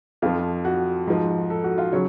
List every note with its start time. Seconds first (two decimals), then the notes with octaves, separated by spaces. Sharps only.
0.22 F2 F3 F4
0.65 F#4
1.07 G#2 F3
1.50 A4
1.64 F#4
1.78 F4
1.93 C#3 F#3 C#5